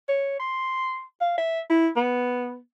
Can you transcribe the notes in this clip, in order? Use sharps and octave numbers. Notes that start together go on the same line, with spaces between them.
C#5
C6
F5
E5
E4
B3